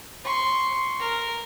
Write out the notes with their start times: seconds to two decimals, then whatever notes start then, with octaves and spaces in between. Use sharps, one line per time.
0.25 C6 C#6
1.00 A#4